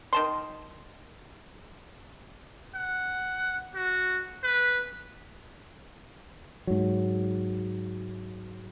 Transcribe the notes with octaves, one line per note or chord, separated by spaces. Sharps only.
D#3 A5 C6
F#5
F#4
B4
G#2 F#3